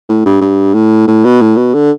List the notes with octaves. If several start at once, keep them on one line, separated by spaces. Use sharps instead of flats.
A2
G2
G2
A2
A2
B2
A2
B2
D3